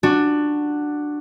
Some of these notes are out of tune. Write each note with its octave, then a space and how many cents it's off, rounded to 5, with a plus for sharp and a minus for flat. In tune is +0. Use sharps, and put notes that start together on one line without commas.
D4 +10 F#4 +0